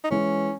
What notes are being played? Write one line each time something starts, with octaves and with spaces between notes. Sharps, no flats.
D#4
E3 G#3 C#4